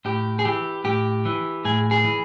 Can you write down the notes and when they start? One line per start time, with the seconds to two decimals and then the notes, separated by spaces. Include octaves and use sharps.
0.05 A2 G4
0.39 G#4
0.45 E3 G4
0.84 A2 G4
1.25 E3
1.65 A2 G#4
1.91 G#4
2.04 E3